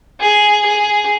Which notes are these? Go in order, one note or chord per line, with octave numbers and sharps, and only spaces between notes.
G#4
G#4